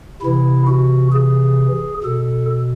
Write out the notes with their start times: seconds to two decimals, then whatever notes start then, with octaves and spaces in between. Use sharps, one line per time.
0.22 C3 E3 E4
0.67 F#4
1.12 G#4
2.04 B2 A4